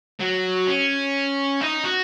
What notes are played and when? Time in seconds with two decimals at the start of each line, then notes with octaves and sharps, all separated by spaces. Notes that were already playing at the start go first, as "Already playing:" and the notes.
0.20 F#3
0.68 C#4
1.61 D#4
1.84 F#4